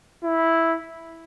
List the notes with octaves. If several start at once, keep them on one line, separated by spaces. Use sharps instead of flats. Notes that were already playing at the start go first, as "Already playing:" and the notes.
E4